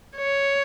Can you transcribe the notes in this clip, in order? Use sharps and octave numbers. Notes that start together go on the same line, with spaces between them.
C#5